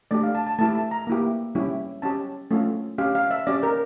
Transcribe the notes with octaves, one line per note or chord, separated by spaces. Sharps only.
A3 D4 G4 D5
F5
A5
A5
A3 E4 G4 A5
A5
A#5
A#3 E4 G4
G3 C#4 E4 G4
C#4 G4 A5
A3 C#4 F4
C#4 G4 F5
F5
E5
C#4 G4 D5
A#4